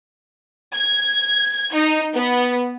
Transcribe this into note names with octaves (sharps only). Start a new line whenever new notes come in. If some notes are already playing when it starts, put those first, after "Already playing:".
G#6
D#4
B3